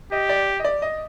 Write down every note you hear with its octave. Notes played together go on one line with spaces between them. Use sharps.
G4 D#5
D5
D#5
D5
D#5